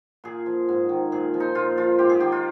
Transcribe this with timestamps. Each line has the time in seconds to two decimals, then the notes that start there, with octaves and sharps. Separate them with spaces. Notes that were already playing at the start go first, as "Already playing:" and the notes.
0.24 A#2 G#4
0.46 F3
0.69 G#2
0.89 D#3
1.12 A#2 G#4
1.34 F3
1.40 D#4
1.55 A#2 F4
1.77 F3 F4
1.99 G#2 G4
2.09 G#4
2.20 D#3 G4
2.32 F4